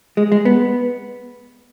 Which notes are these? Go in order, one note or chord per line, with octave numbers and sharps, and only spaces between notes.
G#3
G#3
B3